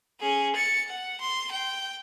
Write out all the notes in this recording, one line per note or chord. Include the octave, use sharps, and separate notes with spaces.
C#4 G#4
A6 C#7
F#5
C6
G5